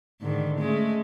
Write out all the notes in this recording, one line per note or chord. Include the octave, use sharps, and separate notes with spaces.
G#2 D3 D#3
G#3 A3 C#4